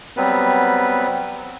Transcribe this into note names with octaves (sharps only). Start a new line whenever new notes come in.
F#3 G3 B3 C4 B4